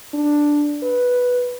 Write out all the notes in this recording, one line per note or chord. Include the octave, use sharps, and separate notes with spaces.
D4
B4